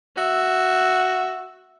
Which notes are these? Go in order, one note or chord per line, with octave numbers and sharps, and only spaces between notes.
F#4 E5